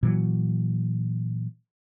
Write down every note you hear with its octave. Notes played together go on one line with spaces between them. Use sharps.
A#2 E3 F#3